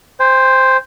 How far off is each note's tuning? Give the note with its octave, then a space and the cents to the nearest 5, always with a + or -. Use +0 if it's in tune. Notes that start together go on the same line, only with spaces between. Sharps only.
C5 +0 G5 +45